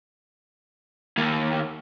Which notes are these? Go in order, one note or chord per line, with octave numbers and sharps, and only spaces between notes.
D#2 A#3